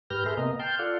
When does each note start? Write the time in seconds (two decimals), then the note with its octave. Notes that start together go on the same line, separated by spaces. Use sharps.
0.10 G#2 G4 B4 F6 G6 A#6
0.26 G#4 A4 B4 E5 C6 F6
0.37 C3 A#3 B3 D#5 A#5
0.59 G5 A5 C6 F6 G6
0.79 F4 A4 D5 F5 F#5